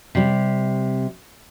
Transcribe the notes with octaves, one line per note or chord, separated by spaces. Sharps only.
C3 G3